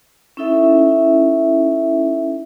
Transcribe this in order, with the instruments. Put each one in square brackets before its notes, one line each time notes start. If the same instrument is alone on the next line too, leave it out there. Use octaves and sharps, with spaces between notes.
[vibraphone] C#4 D#4 E4 A4 E5